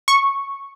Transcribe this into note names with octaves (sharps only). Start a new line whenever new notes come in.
C#6